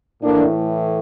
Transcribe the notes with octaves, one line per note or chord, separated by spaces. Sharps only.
A2 E3 A3 A#3 D4